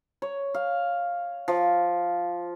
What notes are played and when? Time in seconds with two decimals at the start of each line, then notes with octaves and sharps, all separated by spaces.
0.22 C#5
0.55 F5
1.48 F3